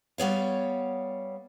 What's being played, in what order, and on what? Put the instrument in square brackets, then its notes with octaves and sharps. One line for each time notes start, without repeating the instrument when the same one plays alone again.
[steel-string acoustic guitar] G3 B3 C#5 F5